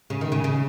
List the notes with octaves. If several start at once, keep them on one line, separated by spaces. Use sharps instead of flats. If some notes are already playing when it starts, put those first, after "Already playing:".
C#3
D#3
C#3
C#3